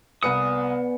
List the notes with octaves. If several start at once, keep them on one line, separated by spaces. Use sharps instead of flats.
C2 B3 B4 D5 G#5 D#6 C#7